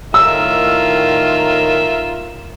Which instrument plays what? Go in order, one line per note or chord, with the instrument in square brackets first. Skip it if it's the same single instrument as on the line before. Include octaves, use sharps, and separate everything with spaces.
[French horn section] A2 D#3 [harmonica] F4 A#4 E5 [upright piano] E6